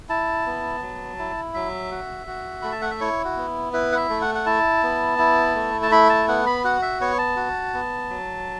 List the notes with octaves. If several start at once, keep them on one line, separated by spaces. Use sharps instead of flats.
E4 A5
B3
F#3
E4
F#3 E5
F#4
F#4
A3 B5
A5
F#5
E5
E4 C#5
F#4
B3
E4 B4
F#5
E5
A3
F#5
F#5
E4 A5
B3
E4
A3
A5
E4 B5
A5
B3 F#5
B5
F#4 F#5
E5
B3 C#5
A5
F#4
B3
F#3